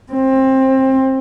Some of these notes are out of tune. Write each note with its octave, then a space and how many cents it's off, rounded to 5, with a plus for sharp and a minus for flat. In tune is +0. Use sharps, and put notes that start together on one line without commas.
C4 +20